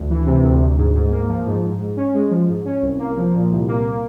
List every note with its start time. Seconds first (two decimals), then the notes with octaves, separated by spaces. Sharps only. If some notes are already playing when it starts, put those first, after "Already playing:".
Already playing: D2
0.09 E3
0.26 C3
0.43 D2
0.61 D2
0.77 G#2
0.94 G#2
1.11 A#3
1.28 F3
1.46 G#2
1.63 G#2
1.79 G#2
1.96 C#4
2.14 G#3
2.30 F3
2.48 G#2
2.65 C#4
2.81 C2
2.98 A#3
3.17 F3
3.33 A#2
3.51 C2
3.67 A#3